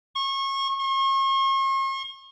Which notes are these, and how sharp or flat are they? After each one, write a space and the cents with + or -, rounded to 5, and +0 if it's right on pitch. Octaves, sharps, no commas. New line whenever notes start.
C#6 -30
C#6 -45